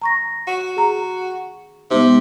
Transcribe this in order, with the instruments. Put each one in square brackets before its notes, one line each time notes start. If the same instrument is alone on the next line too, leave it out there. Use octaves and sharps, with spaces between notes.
[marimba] A#5 C#6 A#6
[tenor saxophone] F#4
[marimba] G#4 A#5
[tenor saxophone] C3 [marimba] G#3 B3 D#4